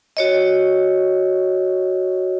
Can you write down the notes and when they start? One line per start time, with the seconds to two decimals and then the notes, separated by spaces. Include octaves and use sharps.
0.17 F#4 C#5 D#5